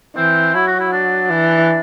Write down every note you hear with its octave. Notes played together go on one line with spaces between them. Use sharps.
E3 C4
F#3 E4
F#4
E4
D4
E3